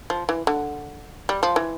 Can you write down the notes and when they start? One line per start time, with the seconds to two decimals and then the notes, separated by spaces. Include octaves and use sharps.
0.10 F3
0.29 E3
0.47 D3
1.29 G3
1.43 F3
1.56 E3